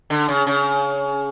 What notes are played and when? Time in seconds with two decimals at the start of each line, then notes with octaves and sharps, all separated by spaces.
0.10 D3
0.28 C#3
0.47 C#3